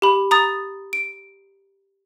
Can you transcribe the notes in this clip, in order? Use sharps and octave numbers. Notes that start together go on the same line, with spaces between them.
G4 B5
A#5 D#6 A6
D7